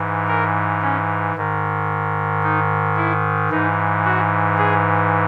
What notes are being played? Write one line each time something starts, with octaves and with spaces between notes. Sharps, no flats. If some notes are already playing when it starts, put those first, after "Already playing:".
Already playing: G#2 E3
A#4
C#4
G#2 D#3
D#4
E4
G#2 E3 D#4
F#4
G#4